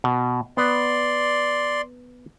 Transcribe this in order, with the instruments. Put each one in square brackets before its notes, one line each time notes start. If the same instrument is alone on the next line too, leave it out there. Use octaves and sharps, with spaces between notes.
[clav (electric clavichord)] B2
[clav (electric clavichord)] B3 B4 [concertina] D5 C6